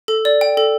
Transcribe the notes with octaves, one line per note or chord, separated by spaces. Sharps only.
A4
D5
G5
A4